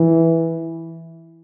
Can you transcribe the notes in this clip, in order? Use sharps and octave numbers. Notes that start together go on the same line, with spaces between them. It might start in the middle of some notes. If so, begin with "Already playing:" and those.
Already playing: E3